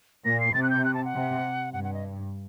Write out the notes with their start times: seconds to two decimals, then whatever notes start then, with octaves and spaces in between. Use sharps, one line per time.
0.24 A#2 A#6
0.40 C7
0.54 C3 A6
0.63 F#6
0.70 G6
0.85 F#6
0.94 A5
1.05 F#5
1.15 C3
1.73 G2 F#5
1.84 F#5
1.94 D#5